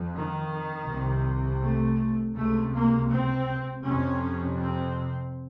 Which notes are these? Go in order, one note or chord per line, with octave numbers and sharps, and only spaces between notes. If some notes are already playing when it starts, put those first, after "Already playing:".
Already playing: F2
D#3
C2 C3
A3
C#2 C3 A3
A#3
C4
F2 C3 C#4
C4